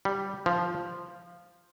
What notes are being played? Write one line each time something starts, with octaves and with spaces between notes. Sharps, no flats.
G3
F3